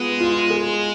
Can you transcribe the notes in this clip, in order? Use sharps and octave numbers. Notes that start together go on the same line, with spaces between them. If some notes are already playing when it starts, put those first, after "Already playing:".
Already playing: G#3 B3 F4 G#4
F4
G#4